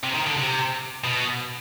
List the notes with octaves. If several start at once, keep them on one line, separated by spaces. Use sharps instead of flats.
C3
D#3
D3
C3
B2